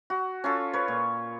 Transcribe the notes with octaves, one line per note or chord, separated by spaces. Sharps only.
F#4
C#4 F4 A4
B4 C#5
A#2